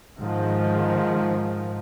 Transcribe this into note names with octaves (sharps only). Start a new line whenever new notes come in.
G#2 D#3 F3